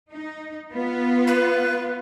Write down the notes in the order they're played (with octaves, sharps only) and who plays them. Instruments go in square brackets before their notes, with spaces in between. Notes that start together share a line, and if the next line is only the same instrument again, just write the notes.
[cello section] D#4
B3 F4
[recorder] B4